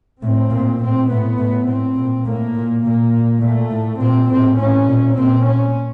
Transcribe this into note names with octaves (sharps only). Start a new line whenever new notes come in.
A2 C4
A#2
A2 C4
A2 B3
A2
A2 C4
A#2
A2 A#3
A#2
A#2 A#3
A#2
A#2 A3
A2
A#2 C4
A2 C4
A2 C#4
A#2
A#2 C4
A#2 C#4